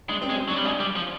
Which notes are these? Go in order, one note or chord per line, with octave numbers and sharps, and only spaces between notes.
G#3 D4
C4
G#3 C#4
F#3 D4
G3
G#3
G3
F3